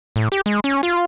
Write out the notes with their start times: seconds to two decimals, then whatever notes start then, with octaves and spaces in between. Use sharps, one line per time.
0.16 A2
0.32 G4
0.46 G#3
0.64 C#4
0.83 F4